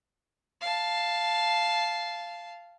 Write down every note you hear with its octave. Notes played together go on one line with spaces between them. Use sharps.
F5 A5